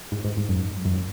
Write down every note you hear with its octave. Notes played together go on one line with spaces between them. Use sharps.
G#2
G#2
G#2
F#2
F#2